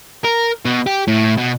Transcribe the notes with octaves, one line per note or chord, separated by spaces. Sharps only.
A#4
B2
G4
A2
B2